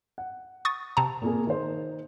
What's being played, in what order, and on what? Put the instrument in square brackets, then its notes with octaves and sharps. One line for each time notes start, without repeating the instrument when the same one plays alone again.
[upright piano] F#5
[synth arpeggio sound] C#6 D#6 A6
C3 A5 A#5
[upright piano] A#2 A#3 G#4
D#3 C5